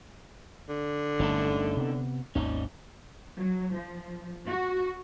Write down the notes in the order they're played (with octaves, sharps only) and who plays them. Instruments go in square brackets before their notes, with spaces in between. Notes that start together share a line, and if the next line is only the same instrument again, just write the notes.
[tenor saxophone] D3
[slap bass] G1 A3 [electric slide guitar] C#4 D#4 A4
[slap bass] C3 B3
[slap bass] G#1 D#2 [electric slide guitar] C#4 D#4
[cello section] F#3
F3
F#4